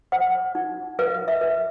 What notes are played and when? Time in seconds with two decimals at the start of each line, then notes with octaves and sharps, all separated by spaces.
0.12 C5 F#5
0.55 D#4
0.99 B4 F5
1.28 E5
1.41 B4